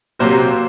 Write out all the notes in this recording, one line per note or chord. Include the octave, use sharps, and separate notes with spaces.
C3 F#3 A#3 F#4 C5